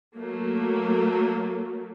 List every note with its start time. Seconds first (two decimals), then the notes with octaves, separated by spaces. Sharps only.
0.16 F#3 A3 A#3